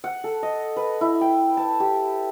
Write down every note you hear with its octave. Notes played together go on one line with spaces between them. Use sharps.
F#5
A4
D#5
B4
E4
G5
A5
G4